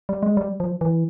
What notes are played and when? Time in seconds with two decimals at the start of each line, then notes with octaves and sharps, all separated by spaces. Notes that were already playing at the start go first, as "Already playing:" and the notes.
0.09 G3
0.23 G#3
0.37 G3
0.60 F3
0.81 E3